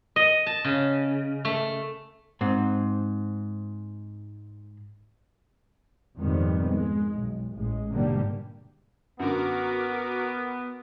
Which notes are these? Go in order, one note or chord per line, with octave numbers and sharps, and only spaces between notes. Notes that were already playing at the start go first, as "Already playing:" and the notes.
D#5
A5
C#3
A3
G#2 C4
F2 G#2 B2 D#3 G3 B3
G#3
B1
A1 G#3
G#2 B2 D3 G3 A#3
F#2 D3 B3 F#4 A#4 D6